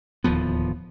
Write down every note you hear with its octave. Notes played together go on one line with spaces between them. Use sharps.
D1 D#2 F3 B3